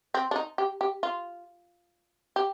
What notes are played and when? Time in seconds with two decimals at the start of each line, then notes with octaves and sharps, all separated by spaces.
0.14 C4
0.31 D4
0.36 D#4
0.58 G4
0.81 G4
1.03 F4
2.36 G4